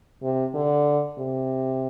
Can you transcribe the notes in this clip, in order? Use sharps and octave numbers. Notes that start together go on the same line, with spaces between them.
C3
D3
C3